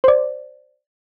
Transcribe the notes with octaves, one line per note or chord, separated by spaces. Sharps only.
C5 D5